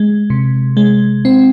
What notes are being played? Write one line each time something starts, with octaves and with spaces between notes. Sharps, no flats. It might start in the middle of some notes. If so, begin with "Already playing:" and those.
Already playing: G#3
C3
G#3
C4